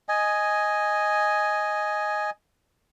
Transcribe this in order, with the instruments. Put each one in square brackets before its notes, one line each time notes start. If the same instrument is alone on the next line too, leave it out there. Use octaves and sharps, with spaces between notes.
[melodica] D#5 G#5